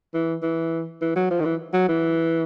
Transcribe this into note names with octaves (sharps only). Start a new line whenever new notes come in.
E3
E3
E3
F#3
F3
D#3
E3
F#3
E3